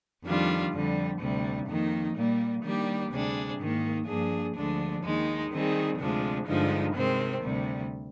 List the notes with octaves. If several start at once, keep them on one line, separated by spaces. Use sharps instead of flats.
F2 D#3 G3 D4 F4
F2 D3 G3
D2 C3 G3
F2 D#3 A#3 D#4
A#2 G3 A#3
D#3 G3 A#3 D4 G4
D2 C3 G3 D4 G#4
G#2 D#3 A#3
G2 F3 A#3 D4 G#4
D2 D3 F3 G#3 D4
D#2 D#3 G#3 D#4
D#3 G3 C4 D#4 G#4
D2 C3 F3 G#3 D4
G2 D3 F3 G#3 D#4
C3 D#3 G#3 C4
D2 C3 G3